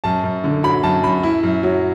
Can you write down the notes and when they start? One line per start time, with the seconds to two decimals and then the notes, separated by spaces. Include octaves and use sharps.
0.04 F#2 A5
0.24 F#2
0.44 D3
0.63 F#3 B5
0.83 F#2 A5
1.03 F#2 B5
1.23 E4
1.43 F#2
1.63 F#3